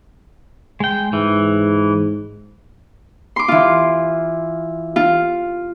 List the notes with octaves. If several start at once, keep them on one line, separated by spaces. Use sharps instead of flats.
G#3 G5
G#2 E3
C6 D6
E3 F4
F4